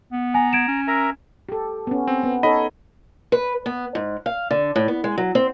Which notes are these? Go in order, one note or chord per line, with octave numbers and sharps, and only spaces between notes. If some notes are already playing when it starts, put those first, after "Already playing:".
B3
G#5 A#5
G#6 D7 E7
C#4
A#4 E5 A#5
G4 A4
B3 C#4
C4
B3
D#4 A4 C#5 D#5 B5
B4
B3
G#2
F5
D3
A2
B3
G#3
F#3
C4